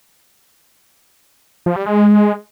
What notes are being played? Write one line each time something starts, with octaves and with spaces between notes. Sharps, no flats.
F3
G3
G#3